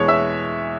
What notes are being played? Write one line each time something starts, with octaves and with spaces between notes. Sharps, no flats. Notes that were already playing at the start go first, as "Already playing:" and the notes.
Already playing: E2 B2 G#3 C#5 C#6
E5 E6